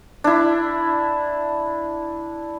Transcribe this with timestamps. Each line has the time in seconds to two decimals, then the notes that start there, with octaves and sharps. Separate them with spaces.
0.24 D4 E4